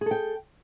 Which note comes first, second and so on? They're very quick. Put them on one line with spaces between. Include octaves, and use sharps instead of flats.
G#4 A4 G5